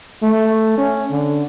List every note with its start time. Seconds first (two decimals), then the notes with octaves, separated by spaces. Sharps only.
0.23 A3
0.78 C#4
1.11 D3